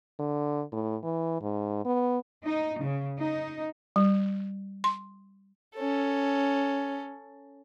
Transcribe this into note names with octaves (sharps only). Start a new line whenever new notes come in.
D3
A2
E3
G#2
B3
D#4
C#3
D#4
G3
C6
C#4 A4